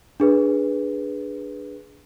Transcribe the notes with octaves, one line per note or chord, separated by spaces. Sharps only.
D4 G#4 B4